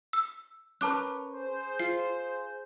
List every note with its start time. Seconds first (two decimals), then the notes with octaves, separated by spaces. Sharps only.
0.13 E6
0.81 C#4 A#4 B4 A5 D6 F#6
1.33 G#4 C5
1.79 F4 C7